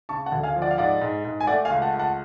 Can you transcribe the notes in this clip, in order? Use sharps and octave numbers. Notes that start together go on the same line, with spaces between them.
C#3 A5 C#6
F#5 A5
D2
F5 G#5
F3
D5 F#5
F5
G#2 D5 F#5
G#2
G#2
G#5
A3 D5 F#5
F5 G#5
C#2
F#5 A5
C#2
F#5 A5